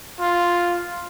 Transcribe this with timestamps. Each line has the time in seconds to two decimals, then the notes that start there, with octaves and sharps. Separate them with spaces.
0.21 F4